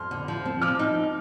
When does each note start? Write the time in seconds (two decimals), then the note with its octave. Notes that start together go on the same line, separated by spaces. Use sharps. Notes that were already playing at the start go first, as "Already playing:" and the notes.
Already playing: F2 C6 F6
0.11 D3
0.28 F3
0.46 C4
0.62 F3 D6 F6
0.79 D#4